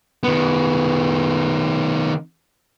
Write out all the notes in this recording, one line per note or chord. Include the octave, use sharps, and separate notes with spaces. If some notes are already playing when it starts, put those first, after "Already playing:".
D#3 B3